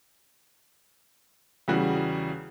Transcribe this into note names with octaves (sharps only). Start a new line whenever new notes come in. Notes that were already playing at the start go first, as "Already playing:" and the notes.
E2 C#3 G3 F#4